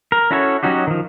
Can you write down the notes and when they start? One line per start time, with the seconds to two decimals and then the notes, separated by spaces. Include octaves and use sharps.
0.12 A#4
0.31 C#4 E4 F#4 A4 C#5
0.63 F#3 C#4 D#4 F#4 G4
0.87 D#3 F3